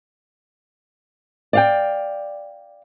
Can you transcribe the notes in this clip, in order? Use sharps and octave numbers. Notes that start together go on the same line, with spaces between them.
D5 F5 G5